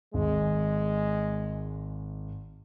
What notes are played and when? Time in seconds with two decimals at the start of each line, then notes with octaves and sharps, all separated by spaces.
0.14 G#1 G#3